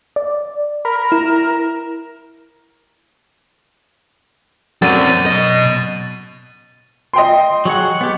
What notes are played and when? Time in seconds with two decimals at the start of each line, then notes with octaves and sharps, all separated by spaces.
0.16 D5
0.85 A#4 B5
1.12 E4
4.82 F#2 C4 D5 A6 D#7
5.26 B2 D#5
7.13 D#5 G5 C6
7.65 F#3 G#4 F#5
8.01 B3 G4